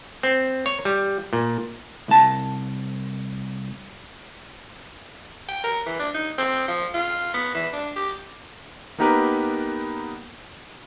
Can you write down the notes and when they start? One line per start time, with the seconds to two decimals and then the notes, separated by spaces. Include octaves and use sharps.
0.23 C4
0.66 C#5
0.85 G3
1.33 A#2
2.08 C2 A5
5.49 G5
5.64 A#4
5.86 E3
5.99 D4
6.15 D#4
6.38 C4
6.68 F3
6.94 F4
7.34 B3
7.55 E3
7.73 D4
7.96 G4
8.99 A#3 B3 D#4 G4 A#4 B4